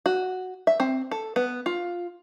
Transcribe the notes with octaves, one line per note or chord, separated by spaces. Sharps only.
F#4
E5
C4
A4
B3
F4